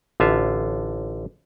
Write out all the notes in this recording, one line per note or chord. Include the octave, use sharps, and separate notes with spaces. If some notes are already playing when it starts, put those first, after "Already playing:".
A1 D3 F4 E5